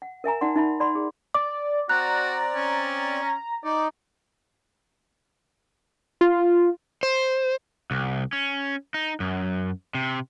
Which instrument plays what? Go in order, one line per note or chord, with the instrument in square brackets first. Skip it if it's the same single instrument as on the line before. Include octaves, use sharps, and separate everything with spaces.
[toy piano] F#5
A#4 E5 G#5 A#5
D#4 D5 F#5 C6
D#4 E5 B5
D5 F#5 B5 C6
G#4
[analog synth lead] D5 [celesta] D6
[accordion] C4 D5 [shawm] F#4 [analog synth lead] A#5 [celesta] F#6
[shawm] C#4
[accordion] D#4 [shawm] D5
[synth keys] F4
[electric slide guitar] C5
[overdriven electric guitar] C2
C#4
D#4
F#2
C3